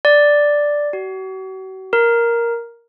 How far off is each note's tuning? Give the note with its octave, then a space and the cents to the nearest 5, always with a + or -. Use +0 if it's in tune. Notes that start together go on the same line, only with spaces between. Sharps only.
D5 +0
F#4 +40
A#4 +5